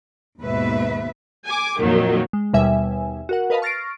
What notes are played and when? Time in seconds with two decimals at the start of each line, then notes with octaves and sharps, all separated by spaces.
0.40 D#2 G#2 B2 B4 E5
1.44 G#5 D6
1.80 F2 A#2 D#3 F#3
2.33 G#3
2.53 D#2 B2 G3 E5 G#5
3.29 F#4 A#4 F#5
3.50 A#4 B4 D#5 F5 A5 B5
3.62 C#6 F6 A6 A#6 C7 D7